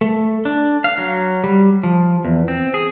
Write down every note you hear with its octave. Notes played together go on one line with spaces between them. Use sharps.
A3
D4
F5
F#3
G3
F3
E2
C4
G#4